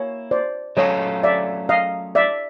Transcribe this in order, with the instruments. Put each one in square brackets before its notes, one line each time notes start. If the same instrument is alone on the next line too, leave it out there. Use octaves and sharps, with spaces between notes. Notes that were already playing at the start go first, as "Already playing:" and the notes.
Already playing: [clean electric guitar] A#3 E4 [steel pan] C#5
[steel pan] C5 D5
[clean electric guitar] F#3 A3 C#4 F4 A4 [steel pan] C#5 D#5
[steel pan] D5 E5
D#5 F5
D5 E5